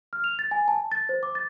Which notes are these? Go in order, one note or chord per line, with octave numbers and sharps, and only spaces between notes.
F6
F7
A6
G#5
A5
A6
C5
D6
A6